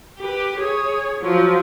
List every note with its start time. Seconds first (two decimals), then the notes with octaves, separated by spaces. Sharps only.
0.19 G4 B4
0.58 G#4 C#5
1.21 F3 F#3